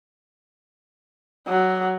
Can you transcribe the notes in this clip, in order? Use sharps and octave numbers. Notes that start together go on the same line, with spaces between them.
F#3